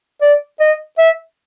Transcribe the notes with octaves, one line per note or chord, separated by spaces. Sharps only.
D5
D#5
E5